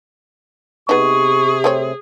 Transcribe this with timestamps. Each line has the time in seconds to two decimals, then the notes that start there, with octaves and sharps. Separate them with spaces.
0.89 C3 B3 D#4 G#4 C#6
1.64 A3 C4 C#5